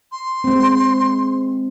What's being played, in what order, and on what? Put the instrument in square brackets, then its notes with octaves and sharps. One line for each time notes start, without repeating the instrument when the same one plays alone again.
[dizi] C6
[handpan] G#3 C4